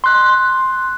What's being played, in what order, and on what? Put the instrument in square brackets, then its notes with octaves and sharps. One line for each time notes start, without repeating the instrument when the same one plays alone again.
[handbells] C6 F#6